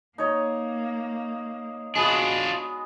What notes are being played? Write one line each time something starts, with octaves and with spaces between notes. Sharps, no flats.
A#3 D#4 C#5
G#3 B3 D4 F4 F#4